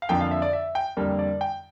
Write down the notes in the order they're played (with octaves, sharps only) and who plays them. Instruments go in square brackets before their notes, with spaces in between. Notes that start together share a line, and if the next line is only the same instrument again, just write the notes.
[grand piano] F5
F2 D3 F3 A#3 G5
F5
E5
D5
E5
G5
F2 D3 G3 A#3 A#4
D5
G5